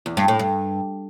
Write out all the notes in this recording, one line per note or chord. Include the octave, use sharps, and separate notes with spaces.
E2
G2
A2
G2